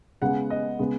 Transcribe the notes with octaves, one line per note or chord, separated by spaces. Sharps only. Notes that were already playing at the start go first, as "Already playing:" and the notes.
C#3 G#3 B3 F#5
D#5
C#3 G#3 B3